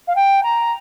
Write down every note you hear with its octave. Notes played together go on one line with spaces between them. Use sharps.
F5
G5
A#5